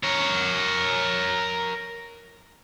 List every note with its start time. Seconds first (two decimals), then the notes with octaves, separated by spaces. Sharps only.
0.03 A#4 C#5